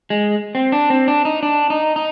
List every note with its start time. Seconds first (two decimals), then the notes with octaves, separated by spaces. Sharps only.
0.10 G#3
0.55 C4
0.72 D4
0.90 C4
1.08 D4
1.25 D#4
1.43 D4
1.70 D#4
1.96 D#4